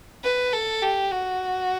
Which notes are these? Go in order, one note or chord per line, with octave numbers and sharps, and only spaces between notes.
B4
A4
G4
F#4